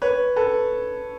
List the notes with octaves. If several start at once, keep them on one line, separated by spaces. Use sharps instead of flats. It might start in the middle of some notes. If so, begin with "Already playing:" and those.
B4 C#5
A4 B4